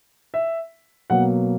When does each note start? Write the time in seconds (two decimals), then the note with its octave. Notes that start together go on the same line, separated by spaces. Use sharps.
0.34 E5
1.10 B2 F#3 A#3 F#5